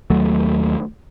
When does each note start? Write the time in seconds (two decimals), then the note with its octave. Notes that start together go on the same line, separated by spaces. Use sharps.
0.10 D#2 F#3 A3